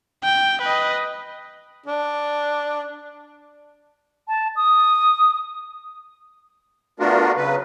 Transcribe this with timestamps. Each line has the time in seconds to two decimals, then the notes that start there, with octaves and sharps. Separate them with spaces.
0.24 G5
0.61 B4 D#5
1.86 D4
4.28 A5
4.56 D#6
7.00 A3 B3 D4 F4 F#4 A#4
7.36 C#3 F#3 B4